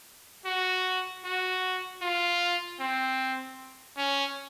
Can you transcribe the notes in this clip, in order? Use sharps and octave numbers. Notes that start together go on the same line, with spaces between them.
F#4
F#4
F4
C4
C#4